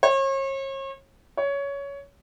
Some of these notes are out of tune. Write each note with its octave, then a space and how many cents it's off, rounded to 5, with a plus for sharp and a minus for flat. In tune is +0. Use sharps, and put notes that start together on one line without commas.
C#5 -40
C#5 +15